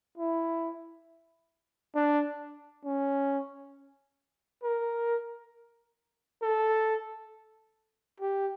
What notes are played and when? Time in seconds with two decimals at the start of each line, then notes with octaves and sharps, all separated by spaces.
0.18 E4
1.95 D4
2.85 C#4
4.63 A#4
6.42 A4
8.20 G4